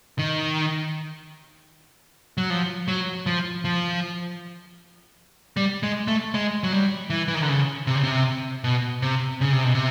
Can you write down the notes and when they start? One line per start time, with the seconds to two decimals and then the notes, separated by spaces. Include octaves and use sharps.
0.19 D#3
2.37 F#3
2.50 F3
2.88 F#3
3.26 F3
3.65 F3
5.57 G3
5.83 G#3
6.08 A3
6.34 G#3
6.63 F#3
6.72 G3
7.10 E3
7.28 E3
7.35 D#3
7.42 D3
7.49 C#3
7.87 C3
7.96 C#3
8.04 C3
8.64 B2
9.02 C3
9.41 C#3
9.53 C3
9.64 B2
9.75 C3